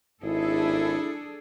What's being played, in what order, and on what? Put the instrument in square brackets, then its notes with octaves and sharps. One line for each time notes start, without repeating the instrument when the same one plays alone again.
[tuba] G#1 [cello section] D4 G#4 A4 [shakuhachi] E4